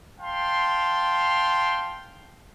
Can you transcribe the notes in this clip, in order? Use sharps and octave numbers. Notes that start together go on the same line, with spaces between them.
F5 G5 A5 C6